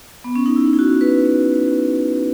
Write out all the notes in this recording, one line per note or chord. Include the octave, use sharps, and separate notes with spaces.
B3
C#4
D#4
E4
E4
F#4
B4